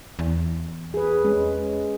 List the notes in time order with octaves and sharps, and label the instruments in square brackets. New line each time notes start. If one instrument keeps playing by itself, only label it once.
[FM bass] E2
[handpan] G#4 B4
G#3 C#4